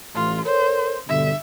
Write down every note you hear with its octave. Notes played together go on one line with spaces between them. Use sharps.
A1 F4
A4 A#4 C5 C#5
G2 B2 D3 E5